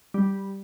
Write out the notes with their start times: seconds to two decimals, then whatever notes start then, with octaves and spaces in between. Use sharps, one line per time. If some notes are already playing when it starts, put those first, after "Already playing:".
0.14 G3